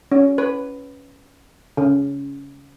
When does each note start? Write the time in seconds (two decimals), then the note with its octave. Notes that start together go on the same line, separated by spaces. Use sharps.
0.12 C#4
0.38 B4
1.77 C#3